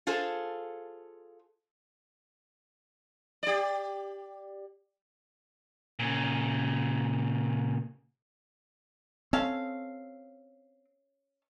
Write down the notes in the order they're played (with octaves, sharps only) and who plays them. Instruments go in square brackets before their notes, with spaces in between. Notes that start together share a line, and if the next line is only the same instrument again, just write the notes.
[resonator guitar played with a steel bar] F4 G#4 A4 C5
[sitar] G4 D5
[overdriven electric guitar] A#2 C#3
[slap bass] C4 [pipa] C#4 A4 F5